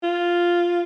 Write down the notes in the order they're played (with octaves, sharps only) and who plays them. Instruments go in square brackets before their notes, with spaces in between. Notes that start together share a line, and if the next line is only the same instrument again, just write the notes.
[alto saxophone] F4